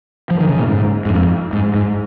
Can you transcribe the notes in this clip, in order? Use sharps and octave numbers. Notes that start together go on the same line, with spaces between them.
F3
D#3
C#3
A#2
G#2
G#2
F2
G#2
G#2